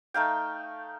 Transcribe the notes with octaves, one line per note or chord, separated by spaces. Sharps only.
A3 D#4 F5 G5